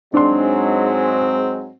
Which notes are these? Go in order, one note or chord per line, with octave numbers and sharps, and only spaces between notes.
G#2 F#3 G#3 C4 D4 C6